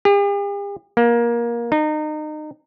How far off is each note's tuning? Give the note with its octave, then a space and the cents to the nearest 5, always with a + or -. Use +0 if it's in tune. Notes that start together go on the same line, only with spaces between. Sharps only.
G4 +45
A#3 +20
D#4 -30